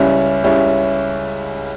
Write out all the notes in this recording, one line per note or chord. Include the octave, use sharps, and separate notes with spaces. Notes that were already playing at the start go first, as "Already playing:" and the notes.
Already playing: C#2 C#3 G3 C#4 E4
C#2 C#3 G3 C#4 E4